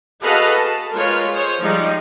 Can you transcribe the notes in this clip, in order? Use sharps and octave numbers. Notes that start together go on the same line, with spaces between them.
F#4 G#4 A4 B4 D#5 F5
A5
G#3 F4 A#4 B4 C#5
G#4 C5 C#5
F3 G3 G#3 D#4